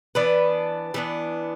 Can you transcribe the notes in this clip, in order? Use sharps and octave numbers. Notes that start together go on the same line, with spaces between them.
E3 B3 D4 B4
E3 B3 D4